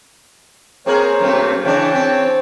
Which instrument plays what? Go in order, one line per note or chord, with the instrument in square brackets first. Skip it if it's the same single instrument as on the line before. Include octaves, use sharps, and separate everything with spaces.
[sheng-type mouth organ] A#3 C5 C#5 [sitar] C4 G#4 A#4
[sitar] F#2 A3 C4
[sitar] C#3 E3 D4 [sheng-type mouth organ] C#5 G5 A5
[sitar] C4